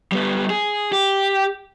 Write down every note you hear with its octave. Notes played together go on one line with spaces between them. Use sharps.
G3 B3
G#4
G4